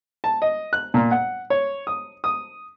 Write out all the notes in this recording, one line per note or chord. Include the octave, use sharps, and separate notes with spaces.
A5
D#5
F#6
A#2
F#5
C#5
D#6
D#6